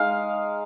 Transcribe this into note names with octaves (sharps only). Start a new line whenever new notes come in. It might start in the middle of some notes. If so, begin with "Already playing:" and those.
Already playing: G#3 D#4 F5